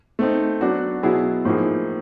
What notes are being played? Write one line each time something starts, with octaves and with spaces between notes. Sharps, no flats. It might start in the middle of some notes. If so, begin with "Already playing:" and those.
A3 C4 D#4
F#3 B3 D4 F#4
B2 F#3 B3 E4 G#4
A2 F3 A#3 D#4 G#4